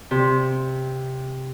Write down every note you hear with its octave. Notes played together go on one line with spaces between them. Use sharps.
C3